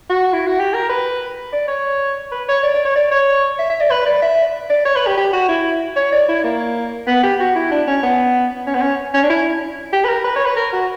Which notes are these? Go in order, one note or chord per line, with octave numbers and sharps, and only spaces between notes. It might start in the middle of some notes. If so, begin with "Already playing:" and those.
F#4
E4
F#4
G4
A#4
B4
D5
C#5
B4
C#5
D5
D5
C#5
D5
C#5
E5
E5
D5
B4
D5
E5
D5
C#5
B4
G4
G4
F#4
E4
C#5
D5
E4
A#3
B3
G4
F#4
E4
D4
C#4
B3
C#4
B3
C#4
C#4
D4
E4
G4
B4
A#4
B4
C#5
B4
A#4
F#4